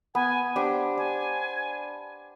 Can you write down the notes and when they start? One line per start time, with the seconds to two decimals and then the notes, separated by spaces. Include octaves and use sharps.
0.15 B3 G#5
0.56 D4 G4 C5
0.97 D4 G#5